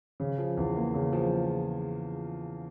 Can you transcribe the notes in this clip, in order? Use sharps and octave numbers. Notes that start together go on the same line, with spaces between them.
C#3
F3
E2
A#3
C#3
F3